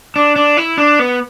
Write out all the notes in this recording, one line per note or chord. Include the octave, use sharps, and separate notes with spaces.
D4
D4
E4
D4
B3